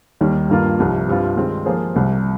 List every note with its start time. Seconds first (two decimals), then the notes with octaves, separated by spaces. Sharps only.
0.21 D#2 D#3 G3
0.49 G2 D#3 A#3 F4
0.79 C2 C3 F3
1.08 G2 G3 C4 F4
1.37 D#3 G#3 C4
1.66 F3 A#3 F4 G#4 C5
1.95 C2 C3 G3